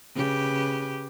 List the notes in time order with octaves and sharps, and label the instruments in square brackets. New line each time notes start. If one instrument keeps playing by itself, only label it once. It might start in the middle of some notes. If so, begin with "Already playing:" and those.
[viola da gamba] C#3 G4 B4